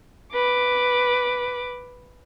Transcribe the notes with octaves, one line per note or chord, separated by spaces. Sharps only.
B4 D6